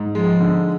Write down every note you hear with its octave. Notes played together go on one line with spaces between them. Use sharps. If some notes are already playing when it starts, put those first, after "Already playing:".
Already playing: G#2
F3 G#3
D3